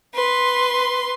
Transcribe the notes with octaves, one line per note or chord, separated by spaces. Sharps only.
B4 C6